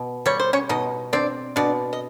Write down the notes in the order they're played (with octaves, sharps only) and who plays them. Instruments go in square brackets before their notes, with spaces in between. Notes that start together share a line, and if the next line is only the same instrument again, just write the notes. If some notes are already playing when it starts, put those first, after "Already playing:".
Already playing: [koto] B2
[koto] G3 [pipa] C#5
[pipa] C5
C#4 C#5
[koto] B2 [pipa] D#4 D#5
[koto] C4 [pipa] D4 D5
[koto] B2 [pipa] D4 D5
[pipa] D#5